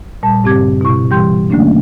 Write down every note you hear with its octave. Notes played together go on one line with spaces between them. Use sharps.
A#2 G3 A5
G2 C#3 C4 G4 D6 G#6
B2 E4 C#6
E3 G3 G4 G5 C6 G6
D3 F#3 A3 A#3 C#4 D4